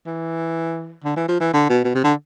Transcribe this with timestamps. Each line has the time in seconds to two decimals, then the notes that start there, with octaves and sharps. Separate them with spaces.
0.06 E3
1.04 D3
1.16 E3
1.29 F3
1.40 E3
1.54 D3
1.70 B2
1.85 B2
1.95 C3
2.04 D3